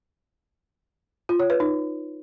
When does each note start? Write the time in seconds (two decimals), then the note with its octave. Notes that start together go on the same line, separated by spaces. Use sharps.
1.29 F4
1.39 C#5
1.50 B4
1.60 D#4